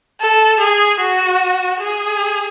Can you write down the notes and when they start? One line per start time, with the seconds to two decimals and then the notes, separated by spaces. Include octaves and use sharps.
0.21 A4
0.60 G#4
1.01 F#4
1.80 G#4